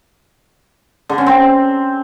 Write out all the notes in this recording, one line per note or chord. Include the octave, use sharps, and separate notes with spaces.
D3
C#4
C4